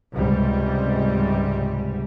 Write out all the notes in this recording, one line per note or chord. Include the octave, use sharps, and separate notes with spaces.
C#2 G#2 C3 G3